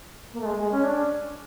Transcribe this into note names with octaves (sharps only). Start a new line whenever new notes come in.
A#3
A3
G#3
G#3
C#4
D4